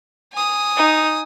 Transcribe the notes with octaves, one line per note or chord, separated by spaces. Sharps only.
G#5 D#6
D#4